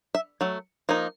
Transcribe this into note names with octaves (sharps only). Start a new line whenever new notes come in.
E5
F#3 A3
F3 A#3 D#4